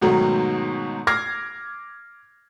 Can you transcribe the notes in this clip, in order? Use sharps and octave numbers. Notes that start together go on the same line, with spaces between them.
G#2 B2 D#3 F#3 A3 F#4
D6 F6 G#6 A#6 C7